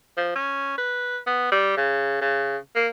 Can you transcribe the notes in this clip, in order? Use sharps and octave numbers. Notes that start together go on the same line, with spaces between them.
F3
C#4
B4
B3
G3
C#3
C#3
A#3